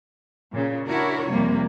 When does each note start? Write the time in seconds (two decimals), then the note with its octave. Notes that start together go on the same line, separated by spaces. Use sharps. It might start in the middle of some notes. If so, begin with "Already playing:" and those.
0.53 A#2 C#3
0.88 D4 E4 F#4 A#4 C#5
1.31 F2 C3 G3 A#3